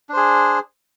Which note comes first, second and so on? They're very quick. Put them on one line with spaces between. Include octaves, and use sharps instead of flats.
D4 C5 G#4